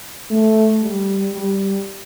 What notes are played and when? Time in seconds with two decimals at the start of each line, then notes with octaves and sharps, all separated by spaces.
0.31 A3
0.82 G3
1.33 G3